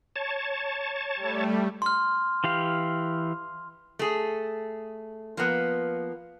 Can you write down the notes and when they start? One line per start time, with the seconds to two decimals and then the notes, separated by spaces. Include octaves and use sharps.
0.16 C#5 A5
1.16 G3 A3
1.82 C6 F6
2.44 E3 G4 F5
3.99 A3 G#4
5.37 F3 A#3 B3